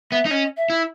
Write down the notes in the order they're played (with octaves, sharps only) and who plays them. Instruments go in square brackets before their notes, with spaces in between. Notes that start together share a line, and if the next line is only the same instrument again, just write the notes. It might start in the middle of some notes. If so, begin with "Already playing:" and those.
[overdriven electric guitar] B3 [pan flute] E5
[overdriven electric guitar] D#4
[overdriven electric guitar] C#4 [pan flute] D#5
[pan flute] E5
[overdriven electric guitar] E4